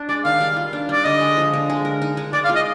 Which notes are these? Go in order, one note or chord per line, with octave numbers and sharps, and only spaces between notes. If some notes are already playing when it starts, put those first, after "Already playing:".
Already playing: D4
G#3 D5
D#3 F5
G3
F4
D4
G3 D5
D3 D#5
G#3
F3
D3
G#3
A#4
D#4
G#3
G#3 D5
F5
F4
D#5